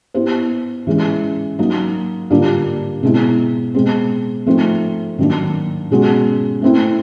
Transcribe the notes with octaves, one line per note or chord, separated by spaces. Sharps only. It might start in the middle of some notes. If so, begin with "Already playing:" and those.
B3 E4 G4 C5
E3 G#3 C#4
F#3 A#3 D#4
D3 G3 A#3 D4 F4
B2 G#3 C4 E4
B2 G#3 C4
F3 A3 C4 D#4
D#3 F#3 A#3 D4
B2 G#3 C#4 F#4
A3 C4 E4